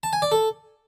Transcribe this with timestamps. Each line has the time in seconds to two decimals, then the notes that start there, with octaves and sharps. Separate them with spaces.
0.03 A5
0.13 G#5
0.22 D5
0.32 A4